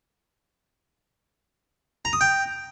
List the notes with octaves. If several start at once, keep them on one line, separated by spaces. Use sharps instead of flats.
A#5
D#6
G5